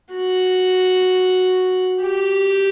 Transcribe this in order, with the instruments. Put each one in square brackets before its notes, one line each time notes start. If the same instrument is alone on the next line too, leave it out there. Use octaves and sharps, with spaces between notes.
[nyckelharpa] F#4
G4